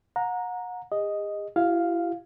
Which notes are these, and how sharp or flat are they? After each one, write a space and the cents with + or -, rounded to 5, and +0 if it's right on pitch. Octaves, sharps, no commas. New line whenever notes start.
F#5 -35 A#5 +0
G#4 -45 D#5 +0
E4 +35 G4 -40 F5 +0